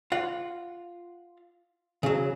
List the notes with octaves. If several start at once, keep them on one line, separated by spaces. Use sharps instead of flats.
F4 F#5
C#3 F#3